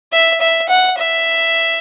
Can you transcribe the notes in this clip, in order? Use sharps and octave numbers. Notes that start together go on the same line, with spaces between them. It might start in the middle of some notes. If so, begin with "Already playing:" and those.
E5
E5
F#5
E5